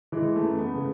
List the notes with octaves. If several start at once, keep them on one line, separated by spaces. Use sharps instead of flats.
E3 G#3
A3
F#2
B3
C#3